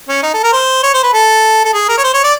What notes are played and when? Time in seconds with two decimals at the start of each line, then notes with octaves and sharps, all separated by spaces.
0.08 C#4
0.23 D#4
0.33 A4
0.43 A#4
0.53 C5
0.83 C#5
0.93 C5
1.03 B4
1.13 A4
1.65 A4
1.73 G#4
1.89 A#4
1.98 C#5
2.04 C5
2.14 C#5
2.24 D5